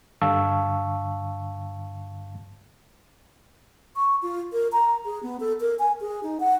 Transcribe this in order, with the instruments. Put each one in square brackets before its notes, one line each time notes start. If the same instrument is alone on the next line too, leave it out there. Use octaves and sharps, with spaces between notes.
[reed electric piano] G2 D3 F5 A5 C#6 E6
[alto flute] C#6
F4
A#4
A#5
G#4
B3
A4
A#4
G#5
G#4
D#4
F#5